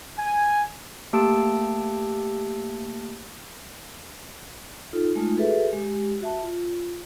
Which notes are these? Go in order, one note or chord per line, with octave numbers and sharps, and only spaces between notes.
G#5
A3 A#3 G4 A5 E6 D7
D#4 F4 A4
G#3 A3 D#4 F4
F#4 G#4 A4 B4 E5
G#3 G4
F#4 E5 A5
F4